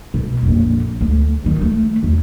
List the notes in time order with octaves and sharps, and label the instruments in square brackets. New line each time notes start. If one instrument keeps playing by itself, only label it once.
[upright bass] B2
A#1 F2
D2
D#3 G3
A3
E2